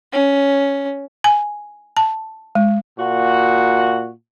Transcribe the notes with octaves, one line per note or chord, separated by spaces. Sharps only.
C#4
G#5
A5
G#3
A#2 F#4